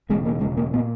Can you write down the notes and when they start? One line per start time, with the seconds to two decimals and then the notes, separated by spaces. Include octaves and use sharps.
0.09 E1 E2 C#3 G#3
0.25 A#3
0.41 E1 E2 C#3 G#3
0.57 A#3
0.74 A#2 B3